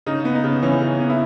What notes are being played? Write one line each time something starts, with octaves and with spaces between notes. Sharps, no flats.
C#3 D#4
B3
D#4
C#3
E3 C#4
C#3
B3
E4